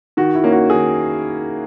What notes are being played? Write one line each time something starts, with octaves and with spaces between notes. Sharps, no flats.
D#3 F#4
E4
A#3 C#4
F#4
D#3 G#4